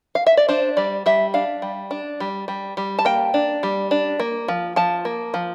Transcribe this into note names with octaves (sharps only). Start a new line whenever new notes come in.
F5
E5
D5
D4 C5
G3 D5
G3 E5
D4 F5
G3
D4
G3
G3
G3
A5
A#3 G5
D4
G3
D4
A#3
F3
F3 A5
A#3
F3